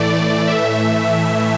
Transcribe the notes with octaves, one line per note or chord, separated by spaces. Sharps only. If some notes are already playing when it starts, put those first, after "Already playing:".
Already playing: A2 E3 A3 D5
E5